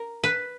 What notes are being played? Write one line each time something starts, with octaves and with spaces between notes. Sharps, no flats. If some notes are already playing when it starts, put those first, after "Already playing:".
Already playing: A#4
B4